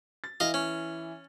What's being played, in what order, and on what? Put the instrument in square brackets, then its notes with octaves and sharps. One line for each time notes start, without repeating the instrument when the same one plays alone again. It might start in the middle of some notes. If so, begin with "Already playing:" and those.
[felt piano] A6
[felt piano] E3 E4 [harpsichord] D#5 F5
[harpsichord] C#4